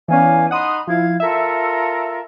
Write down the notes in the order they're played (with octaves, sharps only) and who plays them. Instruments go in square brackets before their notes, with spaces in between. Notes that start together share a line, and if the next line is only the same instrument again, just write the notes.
[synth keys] E3 B3 C#4 [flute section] D5 F5 G#5
[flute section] D#4 B5 C6 [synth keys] F#5 D#6
[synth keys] F3 E4 [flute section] F5 G#6
[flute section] F4 A4 A#4 [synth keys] E5